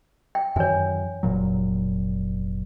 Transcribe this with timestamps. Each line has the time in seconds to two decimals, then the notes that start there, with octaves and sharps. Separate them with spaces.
0.35 G5
0.56 F#2 D#3 E3 C#5 G#5
1.23 F1 A#2 F#3